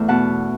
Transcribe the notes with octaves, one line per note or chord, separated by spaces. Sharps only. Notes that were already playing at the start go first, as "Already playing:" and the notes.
Already playing: E2 A3 B4 E5
B2 F#5 A5